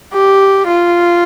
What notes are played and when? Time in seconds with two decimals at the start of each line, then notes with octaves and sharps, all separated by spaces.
0.13 G4
0.67 F4